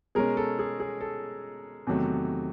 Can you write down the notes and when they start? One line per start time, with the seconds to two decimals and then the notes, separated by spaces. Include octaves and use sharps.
0.15 B2 G#3 C#4 G#4 A#4
0.37 A4
0.59 G#4
0.80 G#4
1.01 A4
1.87 E2 C3 D#3 F#3 A3